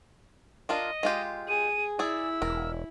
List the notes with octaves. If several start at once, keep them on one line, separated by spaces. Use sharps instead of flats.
D4 F4 A#4 D#5
G#3 F4 G4
G#4 D#7
E4 G#4 D5 E6
E1 A#4